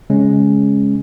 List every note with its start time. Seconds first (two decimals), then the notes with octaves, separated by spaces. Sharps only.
0.10 C#3 G#3 C#4